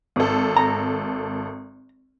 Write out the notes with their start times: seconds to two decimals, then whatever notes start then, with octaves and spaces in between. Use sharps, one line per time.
0.16 G#1 A4
0.57 A#5